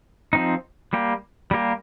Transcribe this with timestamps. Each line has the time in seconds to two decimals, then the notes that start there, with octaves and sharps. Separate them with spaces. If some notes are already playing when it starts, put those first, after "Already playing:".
0.33 F3 C4 D#4
0.93 G3 A#3 G4
1.51 G3 A#3 G4